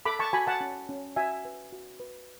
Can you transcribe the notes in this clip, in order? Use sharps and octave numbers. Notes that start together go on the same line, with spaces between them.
A4 B5 D6
A5 C#6
F#4 G#5 B5
F#5 A5
C#4
C#4
F#4 E5 G#5
B4
F#4
B4